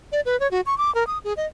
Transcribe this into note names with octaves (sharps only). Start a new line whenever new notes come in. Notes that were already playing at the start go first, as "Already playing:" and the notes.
D5
B4
C#5
F#4
C#6
D6
A#4
D#6
G#4
D#5